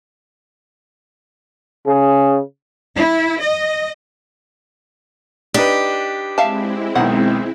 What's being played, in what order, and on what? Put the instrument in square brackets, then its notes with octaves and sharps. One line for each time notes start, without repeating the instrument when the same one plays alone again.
[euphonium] C#3 [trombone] G#4
[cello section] E4
D#5
[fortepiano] D4 D#4 B4 [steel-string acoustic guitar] G4
[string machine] G#3 C4 E4 [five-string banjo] E5 F5 A5
[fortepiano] B1 D#3 [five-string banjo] F#5